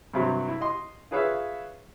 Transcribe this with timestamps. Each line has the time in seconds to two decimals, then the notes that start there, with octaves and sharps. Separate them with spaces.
0.14 G2 C3 F#3
0.48 E4
0.61 D#5 C6
1.11 F4 G#4 B4 C#5 E5 F5